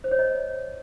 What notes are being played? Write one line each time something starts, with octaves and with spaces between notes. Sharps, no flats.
C5
C#5
D#5